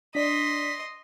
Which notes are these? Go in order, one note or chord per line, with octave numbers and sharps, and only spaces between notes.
D4 D5 D#5 C6 B6